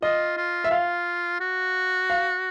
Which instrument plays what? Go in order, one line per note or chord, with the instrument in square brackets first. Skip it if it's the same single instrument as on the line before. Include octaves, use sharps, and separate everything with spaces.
[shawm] F4 [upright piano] D#5
[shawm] F4
[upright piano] E5
[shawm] F4 [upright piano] F5
[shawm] F#4
[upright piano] F5